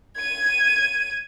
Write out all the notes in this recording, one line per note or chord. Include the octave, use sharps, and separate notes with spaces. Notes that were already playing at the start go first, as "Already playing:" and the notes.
G#6 D#7